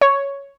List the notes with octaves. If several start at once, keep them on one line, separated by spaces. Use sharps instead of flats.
C#5